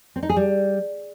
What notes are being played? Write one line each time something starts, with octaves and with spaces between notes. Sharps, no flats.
C4
D#4
G#4
G3